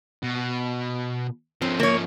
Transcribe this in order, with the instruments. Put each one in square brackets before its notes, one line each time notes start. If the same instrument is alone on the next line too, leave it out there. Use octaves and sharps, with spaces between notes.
[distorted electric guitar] B2
[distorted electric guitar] F3 C#4 [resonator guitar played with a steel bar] C4
[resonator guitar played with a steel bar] A#3 C#5